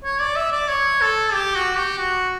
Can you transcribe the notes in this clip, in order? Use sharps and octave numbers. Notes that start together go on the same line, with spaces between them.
C#5
D5
E5
D5
C#5
A4
G4
F#4
G4
F#4